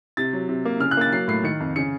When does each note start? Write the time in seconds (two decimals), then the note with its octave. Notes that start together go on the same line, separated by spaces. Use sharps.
0.17 C3 A6
0.33 F#3
0.49 C3
0.65 A#3
0.80 C#3 F6
0.91 F#6
0.97 A#3 A6
1.12 F#3 C7
1.28 A2 C7
1.44 D#3 C#7
1.60 F2
1.76 C#3 C#7